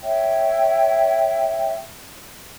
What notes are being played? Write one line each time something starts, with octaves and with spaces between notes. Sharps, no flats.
C#5 E5 G5